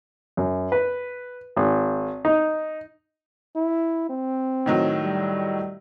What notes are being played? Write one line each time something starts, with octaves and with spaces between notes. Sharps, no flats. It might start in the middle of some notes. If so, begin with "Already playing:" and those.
F#2
B4
G#1
D#4
E4
C4
A2 D#3 F#3
G3